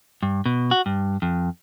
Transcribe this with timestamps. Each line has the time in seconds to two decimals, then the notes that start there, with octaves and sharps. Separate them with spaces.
0.23 G2
0.46 B2
0.71 F#4
0.86 G2
1.22 F2